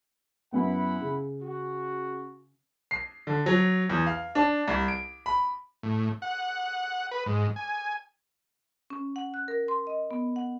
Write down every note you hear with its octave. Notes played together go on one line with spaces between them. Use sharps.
F#2 B3 E4 F#5 B5
C#3
F#4
C7
D3
F#3
E2
F5
D4
C2
D7
B5
A2
F#5
B4
G#2
G#5
C#4
F#5
F#6
A#4
C6
D#5
B3
F#5